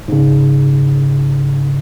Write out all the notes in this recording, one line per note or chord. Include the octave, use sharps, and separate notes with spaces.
G#2 C#3